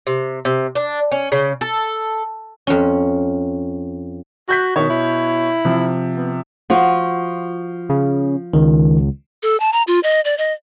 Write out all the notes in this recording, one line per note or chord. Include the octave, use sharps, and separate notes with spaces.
C3
C3
D4
C#4
C#3
A4
F2 C#4
F#4 F#6 G6 B6
B2 D#3 C#5
E4
C3 F3
B3
F3 F4 F#4
C#3
C#2 D#3
A4
A5
A#5
F4
D#5
D5
D#5